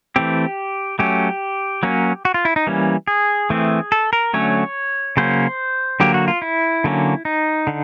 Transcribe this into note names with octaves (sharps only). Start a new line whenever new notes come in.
E3 A3 C4 G4
F#3 A3 C#4 G4
F#3 A#3 C#4
F#4
F4
E4
D#4
E3 G3 A#3 C#4
G#4
E3 A3 C4
A4
A#4
D3 F#3 A3 C#4 C#5
C#3 F#3 A#3 C#4 C5
D3 F#3 A#3 G4
F#4
F4
E4
D3 F#3 A#3 C#4
D#4
D3